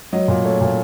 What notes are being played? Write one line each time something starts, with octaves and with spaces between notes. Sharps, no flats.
F#3 D#5
A#2
A3 C#5
A#2